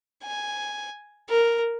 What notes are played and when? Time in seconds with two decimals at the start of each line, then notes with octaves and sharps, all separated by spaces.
0.23 G#5
1.29 A#4